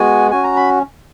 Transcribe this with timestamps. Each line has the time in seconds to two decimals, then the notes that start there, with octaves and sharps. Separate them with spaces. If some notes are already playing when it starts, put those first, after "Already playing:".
Already playing: G#3 B3 F#4 G#5
0.31 C#4 F#4 G#5
0.44 A#5
0.56 B5